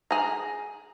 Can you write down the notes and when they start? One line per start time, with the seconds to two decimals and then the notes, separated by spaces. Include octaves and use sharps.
0.11 G#4 A#5